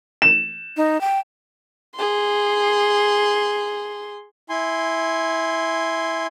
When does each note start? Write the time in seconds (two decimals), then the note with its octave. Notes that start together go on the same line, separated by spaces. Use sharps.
0.22 E7
0.77 D#4
1.01 G5
1.96 G#4 C6
4.49 E4 G#5 C6